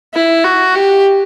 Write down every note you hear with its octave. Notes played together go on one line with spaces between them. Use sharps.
E4
F#4
G4